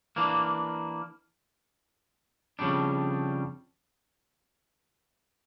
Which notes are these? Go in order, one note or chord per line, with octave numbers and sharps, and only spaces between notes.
E3 A#3 D4
F2 C#3 G3 D4